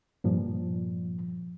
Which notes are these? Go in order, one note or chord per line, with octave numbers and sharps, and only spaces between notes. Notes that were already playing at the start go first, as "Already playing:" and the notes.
G2 A#2 F3